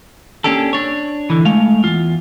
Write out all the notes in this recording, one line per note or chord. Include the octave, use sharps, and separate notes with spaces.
A#3 C#4 D4 G4 A4
D4 C#5
D3 E3
G#3 A3 F5
E2 F4